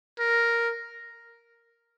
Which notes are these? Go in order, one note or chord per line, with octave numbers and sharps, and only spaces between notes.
A#4